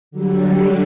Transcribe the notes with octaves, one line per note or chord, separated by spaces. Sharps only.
D3 F#3 G3